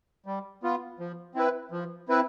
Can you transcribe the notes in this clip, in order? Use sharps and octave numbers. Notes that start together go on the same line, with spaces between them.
G3
B3 F4
F3
C4 E4 B4
F3
C4 E4 B4